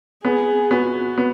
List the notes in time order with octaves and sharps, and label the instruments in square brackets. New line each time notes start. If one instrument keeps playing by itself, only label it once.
[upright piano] B3 [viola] G#4
[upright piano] B3 [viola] F#4
[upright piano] B3